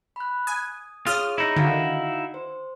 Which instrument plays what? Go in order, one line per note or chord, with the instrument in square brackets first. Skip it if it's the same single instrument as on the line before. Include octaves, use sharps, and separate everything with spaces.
[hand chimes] B5 F#6
[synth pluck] G#5 [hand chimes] D#6
[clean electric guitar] F4 [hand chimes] G#4 C#5 [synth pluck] D#6 F6
[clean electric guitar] D#4 E4
[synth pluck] D3 D#3 [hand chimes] F#4 F5 F#5
[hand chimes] C5